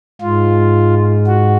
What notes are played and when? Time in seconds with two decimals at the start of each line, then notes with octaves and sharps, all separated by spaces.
0.21 G#2 F4
1.27 F#4